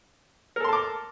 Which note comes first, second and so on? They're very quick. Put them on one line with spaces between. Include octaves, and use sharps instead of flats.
A#4 A4 C6 A5 D6